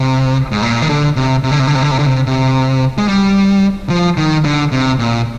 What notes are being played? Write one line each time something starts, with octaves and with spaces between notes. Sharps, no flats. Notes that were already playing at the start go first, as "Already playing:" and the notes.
Already playing: C3
G#2
A#2
D#3
D3
C3
C3
D3
C3
D3
C3
D3
C3
D3
C3
C3
G#3
G3
F3
D#3
D3
C3
A#2